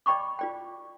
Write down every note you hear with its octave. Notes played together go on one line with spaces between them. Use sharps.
D5 D#5 G5 B5 C#6 D6
F4 D5 G5